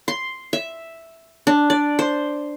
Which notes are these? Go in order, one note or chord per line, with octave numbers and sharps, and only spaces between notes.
C6
E5
D4
D5
C5